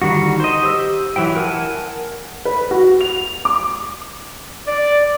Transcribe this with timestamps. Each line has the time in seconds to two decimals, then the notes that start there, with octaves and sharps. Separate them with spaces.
0.02 D3 D#3 G3 F#4
0.40 C5 D#5
0.62 G4 C5 D#6 E6
1.16 E3 F#3 E4 G5
1.37 A#4 F#5 G#5 A5
2.45 B4
2.71 F#4
3.01 F7
3.45 D6
4.67 D5